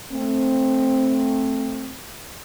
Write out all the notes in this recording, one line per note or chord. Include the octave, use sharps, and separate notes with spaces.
A3 C4